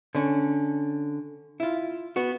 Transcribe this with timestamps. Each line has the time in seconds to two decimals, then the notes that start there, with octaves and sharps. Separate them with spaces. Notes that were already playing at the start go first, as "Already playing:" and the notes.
0.15 D3 C#4
1.60 E4 F4
2.16 B3 F#4